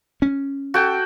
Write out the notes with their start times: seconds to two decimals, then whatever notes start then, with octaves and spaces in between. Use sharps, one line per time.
0.22 C#4
0.74 F#4 A4 G5